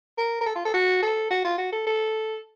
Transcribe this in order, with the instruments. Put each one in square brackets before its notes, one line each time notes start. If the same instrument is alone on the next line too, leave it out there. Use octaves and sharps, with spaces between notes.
[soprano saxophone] A#4
A#4
A4
F4
A4
F#4
A4
F#4
F4
F#4
A4
A4